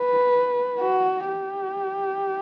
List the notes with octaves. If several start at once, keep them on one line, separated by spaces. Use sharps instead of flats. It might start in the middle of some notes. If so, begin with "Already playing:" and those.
Already playing: B4
F#4
G4